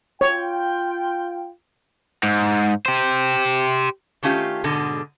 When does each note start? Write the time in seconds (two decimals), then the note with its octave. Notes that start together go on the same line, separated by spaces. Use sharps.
0.21 F4 C#5 G5
2.23 G#2
2.86 G4 C5
4.23 D#3 A3 C#4 F4 G4
4.64 G#2 B2 D3 G#3